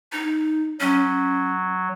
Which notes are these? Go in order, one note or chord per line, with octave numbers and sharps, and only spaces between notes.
D#4
F#3 C#4